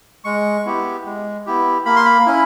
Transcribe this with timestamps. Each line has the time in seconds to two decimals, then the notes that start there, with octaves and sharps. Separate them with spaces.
0.24 G#3 C#6
0.65 B3 E4 G4
1.05 G#3
1.46 B3 E4 G4
1.85 A#3 B5
1.96 C6
2.05 B5
2.26 C#4 E4